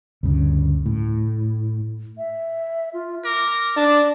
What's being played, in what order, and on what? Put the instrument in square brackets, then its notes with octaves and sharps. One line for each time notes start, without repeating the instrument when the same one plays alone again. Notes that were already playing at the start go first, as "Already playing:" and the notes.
[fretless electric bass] D2 G2 C#3
A2
[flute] E5
F4
[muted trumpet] A#4 [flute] D6
[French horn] D4 [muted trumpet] A5